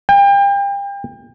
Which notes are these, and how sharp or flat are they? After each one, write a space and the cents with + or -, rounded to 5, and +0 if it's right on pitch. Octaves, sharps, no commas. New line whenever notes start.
G5 +35